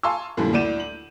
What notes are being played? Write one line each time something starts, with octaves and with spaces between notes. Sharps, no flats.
F5 G#5 A5 C6 C#6 E6
F#2 A#2 D3 E3 F3 G3
D2 E3 D5 G6 D#7 E7
F#7